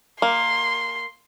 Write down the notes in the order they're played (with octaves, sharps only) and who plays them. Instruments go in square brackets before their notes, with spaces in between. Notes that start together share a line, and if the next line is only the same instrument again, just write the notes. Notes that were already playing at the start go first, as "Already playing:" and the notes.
[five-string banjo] A#3 [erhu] C6